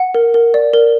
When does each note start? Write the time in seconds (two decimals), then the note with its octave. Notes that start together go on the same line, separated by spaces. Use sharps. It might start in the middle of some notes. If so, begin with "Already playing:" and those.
Already playing: F#5
0.15 A#4
0.34 A#4
0.54 D5
0.74 A#4